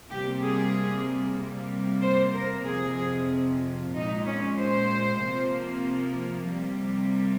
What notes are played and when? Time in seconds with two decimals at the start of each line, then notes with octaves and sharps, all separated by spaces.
0.10 C3 G3 A#3 G4
0.43 G#4
1.38 C3 G3 A#3
2.02 C5
2.35 A#4
2.65 F2 C3 F3 G#4
3.94 A#2 G#3 D#4
4.26 C#4
4.57 C5
5.22 C3 F3 A#3
6.49 C3 G3 A#3